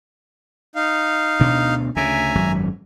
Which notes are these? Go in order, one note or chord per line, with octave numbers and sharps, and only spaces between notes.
D#4 F5
D2 B2 D4
D2 C#3 E5 G#5 A#5
G#1 F#2 F#3